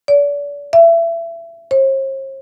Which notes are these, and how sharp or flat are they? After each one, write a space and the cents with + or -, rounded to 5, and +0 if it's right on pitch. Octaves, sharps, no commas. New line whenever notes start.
D5 -40
E5 +25
C5 +45